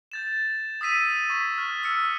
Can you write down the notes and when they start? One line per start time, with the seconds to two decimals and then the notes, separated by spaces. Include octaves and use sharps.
0.12 G6 A6 E7
0.81 D#6 E6 B6 D#7
1.30 C#6 G#6 B6
1.58 F6 A6
1.83 E6 C#7